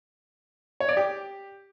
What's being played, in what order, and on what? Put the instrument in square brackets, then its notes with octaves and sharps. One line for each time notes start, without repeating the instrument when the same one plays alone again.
[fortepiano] C#5
D5
G4